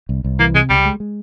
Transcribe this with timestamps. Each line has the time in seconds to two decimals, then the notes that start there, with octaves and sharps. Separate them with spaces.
0.09 C2
0.24 C2
0.39 E3 A#3
0.54 C3 G#3
0.70 C#2 G3
0.85 G#3
1.00 G#3